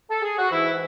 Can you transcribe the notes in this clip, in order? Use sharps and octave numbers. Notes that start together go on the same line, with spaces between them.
A4
G#4
F#4
G#2 E3 E4